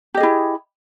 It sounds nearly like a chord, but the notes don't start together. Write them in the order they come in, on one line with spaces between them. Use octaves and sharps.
G4 D#5 G#4 E4